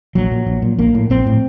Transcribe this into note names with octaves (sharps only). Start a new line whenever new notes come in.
A#1 F#3
A#2
A#1
A#2
A#1 A#3
A2
A#1 C4
A2